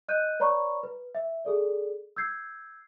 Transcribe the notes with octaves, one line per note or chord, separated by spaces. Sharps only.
D#5 F#6 G6 D#7
B4 C#5 D5 A#5 B5 C#6
B4
E5
G#4 A4 D5
E6 G6 G#6 C7